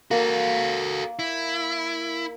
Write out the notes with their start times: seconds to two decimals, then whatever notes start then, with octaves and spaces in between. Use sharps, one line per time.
0.11 A#3 F#4 A4
1.19 E4